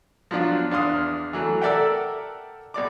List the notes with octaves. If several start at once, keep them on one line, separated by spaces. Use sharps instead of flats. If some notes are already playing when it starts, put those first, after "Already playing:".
F3 F#3 B3 D4 F4
E2 D4 F5 C6 D#6 F6
E3 F#3 A3
A4 A#4 D5 E5 F#5 G5
B1 D5 D6